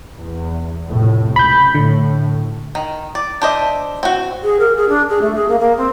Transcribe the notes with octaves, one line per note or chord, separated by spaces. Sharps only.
E2
F1 A2
C#2 B5 G6
A2 D3
D#3
D5
D4 C5 D#5 E5
C4 F#4
G#4
A#4
G#4
D4
G#4
A3
G#4
A#3
A#3
C4